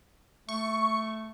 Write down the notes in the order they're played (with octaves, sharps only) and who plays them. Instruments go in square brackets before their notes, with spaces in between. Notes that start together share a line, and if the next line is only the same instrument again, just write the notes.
[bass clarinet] A3 [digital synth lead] C#6